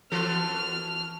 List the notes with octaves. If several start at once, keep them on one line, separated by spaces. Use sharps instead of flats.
E3 F#4 A4 F6